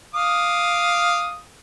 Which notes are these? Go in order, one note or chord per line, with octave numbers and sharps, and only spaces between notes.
F5 D6 D#6